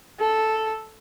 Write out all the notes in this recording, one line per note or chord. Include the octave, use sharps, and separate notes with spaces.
A4